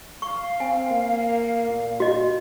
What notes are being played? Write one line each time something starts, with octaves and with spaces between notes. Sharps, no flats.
F5 C#6
C4 G#5
A#3
A#2
F#4 D#5